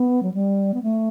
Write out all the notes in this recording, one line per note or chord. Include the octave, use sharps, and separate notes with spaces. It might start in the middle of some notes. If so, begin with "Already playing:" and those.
Already playing: B3
F#3
G3
B3
A3